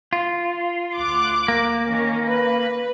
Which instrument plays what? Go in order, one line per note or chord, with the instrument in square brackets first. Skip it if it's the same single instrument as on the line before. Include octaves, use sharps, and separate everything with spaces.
[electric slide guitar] F4
[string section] D2 D6 F#6
[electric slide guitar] A#3
[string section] D#3 C#4
B4